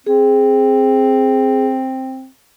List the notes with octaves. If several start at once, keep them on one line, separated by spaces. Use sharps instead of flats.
C4 G#4